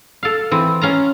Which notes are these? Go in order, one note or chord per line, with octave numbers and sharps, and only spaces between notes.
A4 F5
E3 C4
C#4 F5 A#5